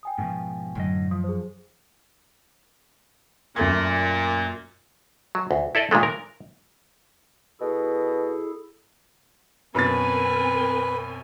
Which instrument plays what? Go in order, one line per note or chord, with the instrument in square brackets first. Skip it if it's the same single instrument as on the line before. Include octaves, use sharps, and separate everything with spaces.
[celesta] G5 G#5 D#6
[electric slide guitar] G#2 B2 F3
[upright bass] F#2 [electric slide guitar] A2 D3 D#5
[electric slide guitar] F3 [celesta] D#6
[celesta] G#4 C5
[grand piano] F#2 A3 G#6 [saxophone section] A#2
[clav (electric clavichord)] F#3
D2
E4 A4 D5 D#5
A#2 D#3 G#3 A3
A#4
[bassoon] B2 [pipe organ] E4 G#4 A4
[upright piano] F#2 B2 A6 [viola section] C4 A#4 G#5 [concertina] B4